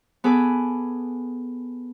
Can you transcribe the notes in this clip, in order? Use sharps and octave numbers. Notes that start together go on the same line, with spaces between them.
B3 G#4 A4 B4 D6